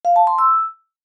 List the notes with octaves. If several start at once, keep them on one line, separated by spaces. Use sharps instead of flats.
F5
A5
C6
E6